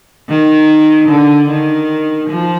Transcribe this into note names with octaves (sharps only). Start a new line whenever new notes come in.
D#3
D3
D#3
F3